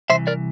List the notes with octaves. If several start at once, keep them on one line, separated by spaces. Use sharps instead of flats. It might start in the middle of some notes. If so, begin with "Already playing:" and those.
C2 C3 E3 C5 E5
A#4 D5